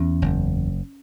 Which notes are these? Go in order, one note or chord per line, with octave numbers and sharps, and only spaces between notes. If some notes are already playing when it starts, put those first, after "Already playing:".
Already playing: E2 C#4
F#1